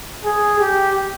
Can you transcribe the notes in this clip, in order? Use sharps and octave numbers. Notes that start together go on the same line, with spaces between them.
G#4
G4